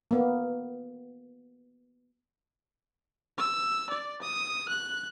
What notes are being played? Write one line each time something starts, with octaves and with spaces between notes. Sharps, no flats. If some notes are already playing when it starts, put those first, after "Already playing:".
A#3 B3
E6
D5
D#6
F#6